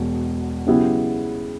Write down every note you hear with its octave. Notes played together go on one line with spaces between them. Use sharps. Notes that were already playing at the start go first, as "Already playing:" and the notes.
Already playing: E1 E2 B2
C#3 F#3 B3 E4 G4